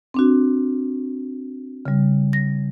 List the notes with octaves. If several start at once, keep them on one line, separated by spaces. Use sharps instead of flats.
C4 D4 F#4
C#3 G3
A#6